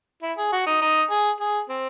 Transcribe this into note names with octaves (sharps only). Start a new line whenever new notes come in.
E4
G#4
F#4
D#4
D#4
G#4
G#4
C4